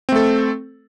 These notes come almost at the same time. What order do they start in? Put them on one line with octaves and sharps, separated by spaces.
C4 A3 A4